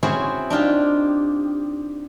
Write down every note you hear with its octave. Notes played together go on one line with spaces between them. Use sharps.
C4 C#4 E4 F#4 G#4 C5
D4 D#4 F4 G4